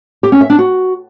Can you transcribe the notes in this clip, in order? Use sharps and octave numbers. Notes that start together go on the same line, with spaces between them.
G4
C#4
E5
D4
F#4